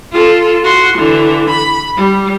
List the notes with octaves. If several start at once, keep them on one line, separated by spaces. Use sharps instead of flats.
F4 A4
F#4 C6
D3 E3
B5
G3